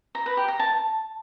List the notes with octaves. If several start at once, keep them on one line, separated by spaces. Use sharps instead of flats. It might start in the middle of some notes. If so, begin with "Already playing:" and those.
A#5
B4
G4
A#5
A5